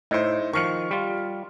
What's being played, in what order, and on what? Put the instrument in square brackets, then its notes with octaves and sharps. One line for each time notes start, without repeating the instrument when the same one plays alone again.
[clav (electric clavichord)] A2 [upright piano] D#4 E4 C5
[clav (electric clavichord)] D#3 F3 [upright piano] C#6 F6 C#7
[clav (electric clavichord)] G3 F4